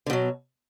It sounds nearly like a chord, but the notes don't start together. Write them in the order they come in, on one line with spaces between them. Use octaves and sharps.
D3 B2 F#3